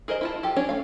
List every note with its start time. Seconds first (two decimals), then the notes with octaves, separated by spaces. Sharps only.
0.08 G#4 A#4 C5 D#5
0.21 E4 F4 A5
0.43 F4 G4 A4
0.56 C#4 D4 C#5
0.69 A3 F5